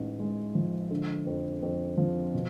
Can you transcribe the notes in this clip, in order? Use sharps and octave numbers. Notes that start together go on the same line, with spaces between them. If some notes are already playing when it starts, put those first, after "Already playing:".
Already playing: A1 G#2
G#3
F3
D3
F2
F2
F3
B2